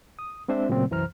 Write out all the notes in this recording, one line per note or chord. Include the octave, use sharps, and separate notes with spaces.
D#6
G#3 C4 D4 C5 E5
A#2 C#3 F#3 A3 C4
C2 F#2 E3 C5 A#5 F6